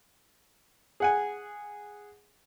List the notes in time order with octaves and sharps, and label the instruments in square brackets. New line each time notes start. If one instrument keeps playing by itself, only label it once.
[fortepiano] G#4 F#5 G#5